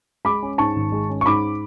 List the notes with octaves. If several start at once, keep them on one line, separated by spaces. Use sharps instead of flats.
G#3 B5 D6
C#4
G#2 A5 C#6
G#1
G#3
C#4
C#6
G#2 B5 D6